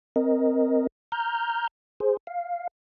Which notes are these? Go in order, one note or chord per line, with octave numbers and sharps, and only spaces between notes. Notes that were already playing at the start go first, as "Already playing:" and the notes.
C4 A#4 D#5
A#5 F6 G6
G#4 C5
F5